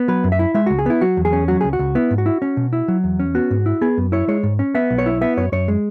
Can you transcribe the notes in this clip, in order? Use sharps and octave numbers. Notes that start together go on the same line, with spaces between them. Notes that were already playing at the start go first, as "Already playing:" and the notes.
Already playing: B3
F#3 B4
F#2
E5
E4
G#3 E5
C#2 F#4
G#4
B3 E4
F#3 F#4
E2
G#4
C#4
F#3 F#4
C#2 G#4
F#4
C#2
B3 E4
G#2
F#4
E4
C#4
B2
E4
F#3
E2
C#4
B3 F#4
G#2
E4
B3 G#4
F#2
E4 C#5
G#3 C#5
G#2
C#4
B3 E5
B1
C#5
E4
B3 E5
F#2 C#5
F#2 C#5
G#3